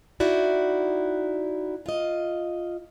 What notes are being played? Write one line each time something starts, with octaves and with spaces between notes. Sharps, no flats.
D#4 E4 F#4 D5
F4 D#5